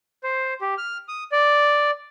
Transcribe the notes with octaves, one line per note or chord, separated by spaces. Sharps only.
C5
G4
F6
D#6
D5